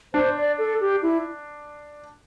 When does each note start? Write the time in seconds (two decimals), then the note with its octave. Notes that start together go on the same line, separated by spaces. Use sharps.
0.14 D4 C5
0.37 D5
0.58 A4
0.81 G4
1.02 E4